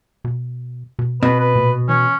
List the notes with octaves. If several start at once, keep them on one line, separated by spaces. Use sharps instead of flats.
B2
B2
B2 C4 B4
B4
A#2
E3 C#4